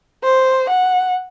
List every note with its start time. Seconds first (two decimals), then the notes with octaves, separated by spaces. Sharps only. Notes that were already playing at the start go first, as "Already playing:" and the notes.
0.24 C5
0.70 F#5